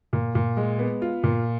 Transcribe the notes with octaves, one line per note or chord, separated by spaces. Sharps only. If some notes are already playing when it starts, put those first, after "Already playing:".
A#2
A#2
G#3
B3
F4
A#2